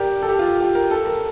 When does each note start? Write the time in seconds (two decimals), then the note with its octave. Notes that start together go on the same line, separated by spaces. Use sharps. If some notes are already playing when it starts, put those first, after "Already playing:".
Already playing: G4 A#4 D5
0.22 A4
0.29 G4
0.39 F4
0.60 G4
0.75 A#4
0.91 A4
1.07 A#4